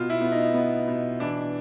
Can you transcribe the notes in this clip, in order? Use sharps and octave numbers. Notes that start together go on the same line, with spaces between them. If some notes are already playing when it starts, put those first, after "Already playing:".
Already playing: B2 F4
E4
B3
D#4
B3
B2
E3 D4